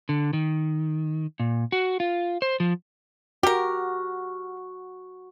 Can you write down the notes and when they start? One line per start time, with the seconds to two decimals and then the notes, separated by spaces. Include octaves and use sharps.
0.09 D3
0.33 D#3
1.40 A#2
1.72 F#4
2.00 F4
2.42 C5
2.60 F3
3.43 F#4 G4 A#4